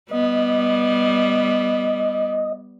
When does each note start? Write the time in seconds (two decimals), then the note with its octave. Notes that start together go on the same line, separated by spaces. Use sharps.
0.11 G3 B3 D#5